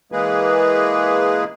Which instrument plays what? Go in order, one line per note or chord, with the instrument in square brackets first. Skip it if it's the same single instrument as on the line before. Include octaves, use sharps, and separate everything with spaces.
[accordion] E3 G#3 A#3 G#4 B4